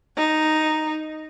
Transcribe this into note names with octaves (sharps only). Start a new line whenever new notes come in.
D#4